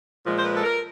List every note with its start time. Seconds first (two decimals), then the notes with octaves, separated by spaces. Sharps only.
0.25 A#2 F3 G#3
0.38 C5
0.44 B4
0.57 A4
0.64 A#4